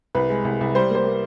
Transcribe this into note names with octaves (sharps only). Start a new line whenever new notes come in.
C2 B4
G#3
C2
C2
G3 C5
A#3 C5
A#3